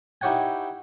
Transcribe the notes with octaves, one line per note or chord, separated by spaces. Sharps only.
D#4 E4 G4 C#5 F#5 G#5